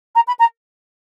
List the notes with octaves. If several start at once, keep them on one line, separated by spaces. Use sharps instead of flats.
A#5
B5
A#5